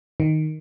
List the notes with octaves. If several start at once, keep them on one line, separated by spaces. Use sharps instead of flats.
D#3